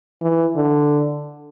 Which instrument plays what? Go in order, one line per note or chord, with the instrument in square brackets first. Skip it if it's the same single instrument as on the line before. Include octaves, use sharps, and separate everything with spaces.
[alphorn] E3
D3